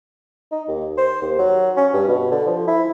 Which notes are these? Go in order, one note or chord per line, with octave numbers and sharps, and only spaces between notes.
D#4
D#2
C5
D#2
F#3
C#4
G2
B2
D3
F3
E4